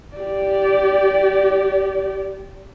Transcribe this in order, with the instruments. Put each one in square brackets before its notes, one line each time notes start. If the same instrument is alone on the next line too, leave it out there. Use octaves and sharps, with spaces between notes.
[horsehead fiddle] G4 D5